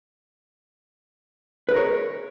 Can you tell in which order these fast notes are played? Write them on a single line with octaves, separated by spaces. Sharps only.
B4 G#4 A#4 C#5